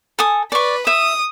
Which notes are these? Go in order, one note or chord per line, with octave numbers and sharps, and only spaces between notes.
A4 G#5 D#6
B4 D5 C#6
E5 D#6